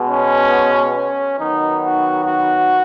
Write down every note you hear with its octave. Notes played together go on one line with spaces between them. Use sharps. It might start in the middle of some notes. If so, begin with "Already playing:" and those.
Already playing: B2 G#3 B3
C#4
C#4
D#3 F#3 B3 D#4
F#4
F#4